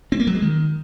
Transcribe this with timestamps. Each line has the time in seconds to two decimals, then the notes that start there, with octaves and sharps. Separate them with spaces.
0.12 C4
0.20 A#3
0.27 F#3
0.35 G#3
0.42 D#3